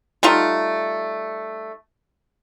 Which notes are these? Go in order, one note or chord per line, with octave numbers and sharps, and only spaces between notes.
G3 A3 D#4 F4